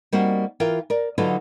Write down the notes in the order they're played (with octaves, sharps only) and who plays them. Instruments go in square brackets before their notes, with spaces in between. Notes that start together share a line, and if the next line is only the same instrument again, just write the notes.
[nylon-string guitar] G3 A#3 C4 D#4 F#4
E3 F4 A#4 G5
A#4 D5
D3 F#3 D#4 F4 A4 B4